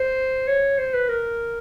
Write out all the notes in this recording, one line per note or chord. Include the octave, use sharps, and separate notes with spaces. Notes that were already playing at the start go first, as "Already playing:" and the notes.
Already playing: C5
C#5
C5
B4
A#4